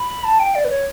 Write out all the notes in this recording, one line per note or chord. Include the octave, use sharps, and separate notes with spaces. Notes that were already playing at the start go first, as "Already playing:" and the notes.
Already playing: B5
A5
G5
D5
B4
C#5